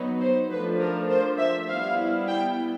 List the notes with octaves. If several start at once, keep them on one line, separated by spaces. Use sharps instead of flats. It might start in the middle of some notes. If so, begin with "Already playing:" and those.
Already playing: F#3 B3 D#4
C5
F3 A3 D4 B4
A#4
C5
E5
G3 B3 E4 F5
G5